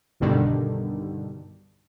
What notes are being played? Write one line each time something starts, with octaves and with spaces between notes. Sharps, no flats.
B1 G2 B2 D3 D#3 G3